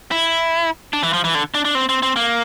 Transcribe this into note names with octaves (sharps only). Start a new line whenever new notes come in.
E4
D4
E3
F3
E3
D3
D4
D4
C4
C4
C4
A#3